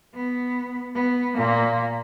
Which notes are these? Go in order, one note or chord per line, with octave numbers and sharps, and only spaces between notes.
B3
B3
A#2 A#3